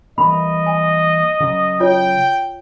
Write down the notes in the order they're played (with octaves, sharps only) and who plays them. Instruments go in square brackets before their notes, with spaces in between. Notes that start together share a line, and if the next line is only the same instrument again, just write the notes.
[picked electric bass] E3 G3 A#3 [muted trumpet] D#5 [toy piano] B5
[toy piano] G#5
[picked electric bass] C#3 F#3
[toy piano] F4 C#5 [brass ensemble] G5